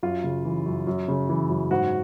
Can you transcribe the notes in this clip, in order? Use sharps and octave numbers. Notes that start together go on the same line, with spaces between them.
F#2 F4
C#3
E3
F#2
F#2
C#3
E3
F#2
G#2 F#4